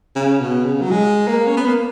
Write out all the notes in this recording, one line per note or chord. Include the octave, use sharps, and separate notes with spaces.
C#3
B2
C#3
F#3
G#3
A#3
C#4
B3
A#3